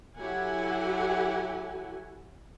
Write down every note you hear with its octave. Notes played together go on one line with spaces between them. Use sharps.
F#3 E4 G4 A4 F#5 G#5